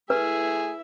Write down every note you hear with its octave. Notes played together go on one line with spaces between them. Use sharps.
A3 E4 G#4 B4 E5